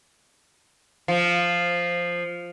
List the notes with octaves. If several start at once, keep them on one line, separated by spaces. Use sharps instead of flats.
F3